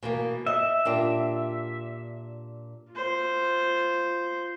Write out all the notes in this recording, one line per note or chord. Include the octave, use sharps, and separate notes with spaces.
B2 E3 A#3
D#5 E5
A#2 D4 G4
F4 C5